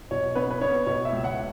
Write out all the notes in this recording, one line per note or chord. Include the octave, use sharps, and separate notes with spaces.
B2 C#5
B3 B4
B4
B3 C#5
B2 C#5
E5
C#2
F#5